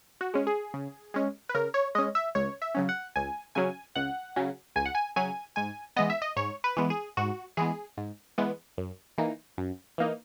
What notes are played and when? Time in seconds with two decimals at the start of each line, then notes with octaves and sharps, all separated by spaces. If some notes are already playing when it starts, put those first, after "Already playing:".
0.21 F#4
0.34 G#3 C#4
0.47 G#4
0.74 C#3
1.14 G#3 C#4
1.49 B4
1.55 C#3 A#4
1.74 C#5
1.95 G#3 C#4 D#5
2.15 E5
2.35 C#2 C#5
2.62 E5
2.75 C#3 F#3 C#4
2.89 F#5
3.16 C#2 G#5
3.55 C#3 F#3 C#4 G#5
3.95 C#2 F#5
4.36 C#3 F#3 C#4
4.76 C#2 G#5
4.85 F#5
4.95 G#5
5.16 C#3 F#3 C#4 G#5
5.56 G#2 G#5
5.96 E3 G#3 B3 D#5
6.10 E5
6.22 D#5
6.36 G#2 C#5
6.64 B4
6.77 E3 G#3 B3
6.90 G#4
7.17 G#2 F#4
7.57 E3 G#3 B3 G#4
7.97 G#2
8.38 E3 G#3 B3
8.78 F#2
9.18 E3 A#3 D#4
9.58 F#2
9.98 E3 A#3 D#4